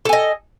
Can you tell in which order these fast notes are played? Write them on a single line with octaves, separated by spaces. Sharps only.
A4 G#5 D#5